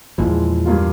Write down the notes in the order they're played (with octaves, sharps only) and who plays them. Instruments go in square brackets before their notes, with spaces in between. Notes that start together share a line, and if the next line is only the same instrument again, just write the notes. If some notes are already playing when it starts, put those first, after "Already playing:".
[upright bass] E2 [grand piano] A#2 F3 G#3 E4
[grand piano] G2 G3 A#3 F4